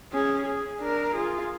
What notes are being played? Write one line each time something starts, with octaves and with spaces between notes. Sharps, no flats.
C#4 G#4
G#4
D4 A#4
F4 G#4